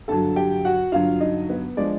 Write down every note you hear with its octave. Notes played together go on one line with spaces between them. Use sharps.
G2 D3 F#3 A4 A5
G4 G5
F#4 F#5
G2 D3 F#3 F4 F5
D#4 D#5
B3 B4
F3 G#3 D4 D5